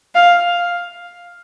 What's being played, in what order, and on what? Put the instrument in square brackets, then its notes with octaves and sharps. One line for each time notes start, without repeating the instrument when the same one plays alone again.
[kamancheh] F5